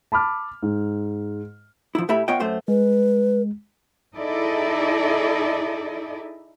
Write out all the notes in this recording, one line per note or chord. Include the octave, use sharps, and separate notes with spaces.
A5 B5 D6 F6
G#2
F3 E4
A2 A3 E4 G4 E5 B5
B3 F4 C#5 D#5 G5
F#2 A3 C5 C6
G#3 B4
D#4 E4 G#4 A4 D5 D#5